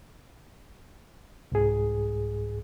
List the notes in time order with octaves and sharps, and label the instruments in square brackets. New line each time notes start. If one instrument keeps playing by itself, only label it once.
[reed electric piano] C2 G#2 G#4